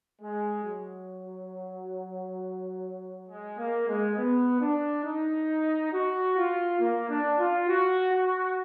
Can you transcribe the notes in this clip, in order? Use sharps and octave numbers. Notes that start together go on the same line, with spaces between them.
G#3
F#3
G#3
A#3
G#3
B3
D4
D#4
F#4
F4
A#3
D4
F4
F#4
F#4